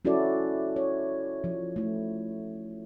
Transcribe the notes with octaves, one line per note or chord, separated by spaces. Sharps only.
C#4 E4 F#4 A4 D5
C#5
F3
A3 E4